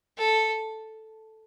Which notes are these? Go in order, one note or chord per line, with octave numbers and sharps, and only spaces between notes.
A4